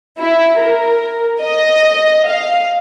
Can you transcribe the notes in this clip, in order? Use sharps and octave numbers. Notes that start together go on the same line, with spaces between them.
E4
A#4
D#5
F5